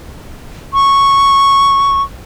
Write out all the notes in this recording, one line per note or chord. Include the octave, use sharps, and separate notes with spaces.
C#6